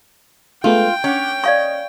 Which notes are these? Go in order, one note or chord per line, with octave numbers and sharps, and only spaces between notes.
G#3 A3 B3 F4 G5
C#4 C#5 F#5 D6
D5 D#5 F5 C#6